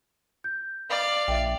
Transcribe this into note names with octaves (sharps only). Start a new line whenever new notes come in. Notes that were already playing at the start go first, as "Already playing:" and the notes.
G6
D5 F5
A#1 E5 G5